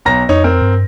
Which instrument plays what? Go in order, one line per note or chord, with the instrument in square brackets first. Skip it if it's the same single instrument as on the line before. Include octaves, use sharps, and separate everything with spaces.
[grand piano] B1 A#5 A#6
[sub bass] F2 [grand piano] D#4 C#5
[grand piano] C4 A#4
[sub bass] G2